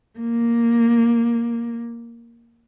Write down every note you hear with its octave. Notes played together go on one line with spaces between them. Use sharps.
A#3